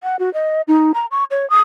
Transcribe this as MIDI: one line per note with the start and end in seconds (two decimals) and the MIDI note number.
0.03 0.16 78
0.19 0.32 66
0.34 0.62 75
0.68 0.92 63
0.94 1.06 82
1.11 1.24 85
1.31 1.48 73
1.50 1.60 87